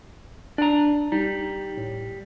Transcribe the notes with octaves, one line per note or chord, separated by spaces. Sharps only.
D4 D5 A#5
G3 D#4
A2